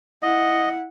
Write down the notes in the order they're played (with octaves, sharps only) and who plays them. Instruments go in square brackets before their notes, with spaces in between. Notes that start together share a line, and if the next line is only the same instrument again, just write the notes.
[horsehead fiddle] E4 F#5 [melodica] D#5